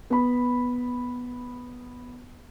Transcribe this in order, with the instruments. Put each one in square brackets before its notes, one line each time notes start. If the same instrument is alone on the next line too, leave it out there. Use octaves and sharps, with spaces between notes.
[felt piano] B3 B5